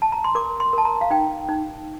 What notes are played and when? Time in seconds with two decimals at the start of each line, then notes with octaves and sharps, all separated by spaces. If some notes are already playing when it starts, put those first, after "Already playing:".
0.02 A5
0.12 A#5
0.24 C6
0.35 A#4 D6
0.60 C6
0.73 A#4 A5
0.85 A#5
1.01 F5
1.11 D#4 G5
1.48 D#4